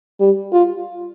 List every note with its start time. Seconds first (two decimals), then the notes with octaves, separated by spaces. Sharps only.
0.20 G3
0.53 F4